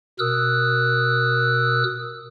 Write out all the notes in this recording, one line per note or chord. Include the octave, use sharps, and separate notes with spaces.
B2 A#4 D#6 E6 F#6